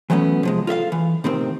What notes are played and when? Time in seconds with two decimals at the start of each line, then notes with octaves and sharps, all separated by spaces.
0.10 E3 F#3 A3 B3 C#4
0.43 C3 F3 G#3
0.67 F4 A4 E5 F5
0.92 E3
1.24 A2 C3 D#3 C4